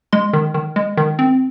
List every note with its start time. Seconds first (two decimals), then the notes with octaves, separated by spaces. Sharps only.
0.13 G#3 C6
0.33 D#3
0.54 D#3
0.76 G#3
0.97 D#3
1.19 C4